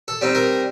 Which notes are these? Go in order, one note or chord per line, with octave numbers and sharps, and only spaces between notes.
A4
G3 C4 D#4
A#4